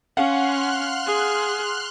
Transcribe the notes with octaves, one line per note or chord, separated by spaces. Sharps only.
C#4 F5 F#5 C6 F6 F#6
G#4